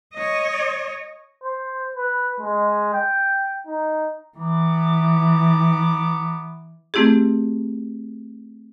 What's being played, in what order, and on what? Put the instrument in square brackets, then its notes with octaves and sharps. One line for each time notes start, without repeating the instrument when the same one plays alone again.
[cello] C#5 D#5
[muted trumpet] C5
B4
G#3
G5
D#4
[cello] E3 [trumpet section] B3 A#5 D6
[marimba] A3 C4 E4 G4 G#4